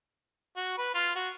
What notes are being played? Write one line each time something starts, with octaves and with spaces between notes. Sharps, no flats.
F#4
B4
F4
F#4